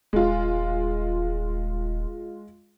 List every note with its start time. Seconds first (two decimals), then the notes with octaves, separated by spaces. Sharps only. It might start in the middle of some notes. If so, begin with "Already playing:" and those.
0.13 D#1 G#3 F4